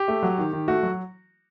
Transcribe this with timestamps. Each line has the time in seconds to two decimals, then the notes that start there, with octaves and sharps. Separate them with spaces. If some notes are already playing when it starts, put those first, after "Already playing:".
Already playing: G4
0.08 A3
0.23 F#3
0.38 D#3
0.53 D#3
0.68 A3 F#4
0.83 F#3